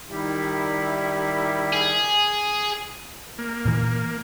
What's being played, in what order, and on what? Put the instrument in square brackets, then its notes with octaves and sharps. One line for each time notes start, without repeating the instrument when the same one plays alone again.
[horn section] D#3 G3 E4
[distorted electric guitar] G#4
[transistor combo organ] A#3
[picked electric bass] A#2 E3